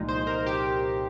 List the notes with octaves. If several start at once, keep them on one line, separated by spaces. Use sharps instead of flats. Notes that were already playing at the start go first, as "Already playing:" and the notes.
Already playing: C2 A#2 F3 G#3 D#4
C5
A#4
G4